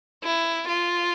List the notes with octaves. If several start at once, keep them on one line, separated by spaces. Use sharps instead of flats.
E4
F4